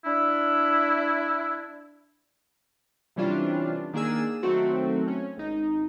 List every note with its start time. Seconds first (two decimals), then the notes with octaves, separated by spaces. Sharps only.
0.05 D4 E4
3.16 C3 E3 G3 C#4 D4 F4
3.93 D#3 A#3 D4 G#4 E6
4.43 D#3 F#3 A3 C4 F#4
5.08 C#4
5.37 G#1 D#4